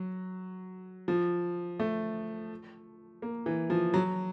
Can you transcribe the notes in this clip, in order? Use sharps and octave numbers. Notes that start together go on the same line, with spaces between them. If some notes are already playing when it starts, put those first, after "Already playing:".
Already playing: F#3
F3
A3
A#3
E3
F3
F#3